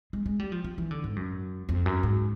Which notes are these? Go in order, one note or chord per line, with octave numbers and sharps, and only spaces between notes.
G#3
G#3
G3
F3
F3
E3
D3
G#2
F#2
F2
F#2
G#2